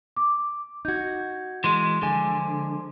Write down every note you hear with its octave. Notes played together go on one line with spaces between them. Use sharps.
D6
D#4 F#4 G6 G#6
E3 G#3 C6
D3 F3 G#3 G#5